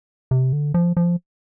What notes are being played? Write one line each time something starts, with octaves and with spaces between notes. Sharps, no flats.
C3
D3
F3
F3